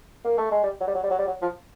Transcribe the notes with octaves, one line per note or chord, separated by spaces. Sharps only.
A#3
A3
G#3
G3
F#3
G3
F#3
G3
F#3
G3
F#3
F3